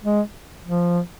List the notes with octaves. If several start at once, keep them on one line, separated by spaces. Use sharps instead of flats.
G#3
F3